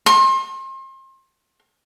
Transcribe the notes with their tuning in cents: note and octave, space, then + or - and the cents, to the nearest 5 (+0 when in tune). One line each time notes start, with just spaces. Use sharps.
C6 +35